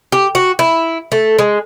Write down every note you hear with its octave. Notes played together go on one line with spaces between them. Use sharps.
G4
F#4
E4
A3
G#3